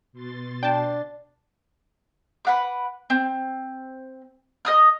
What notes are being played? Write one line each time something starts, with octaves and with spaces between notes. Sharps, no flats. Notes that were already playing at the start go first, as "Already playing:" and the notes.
B2 C6 A6
D4 G5 A5
B4 F#5 D6
C4
D#5 D#6 F6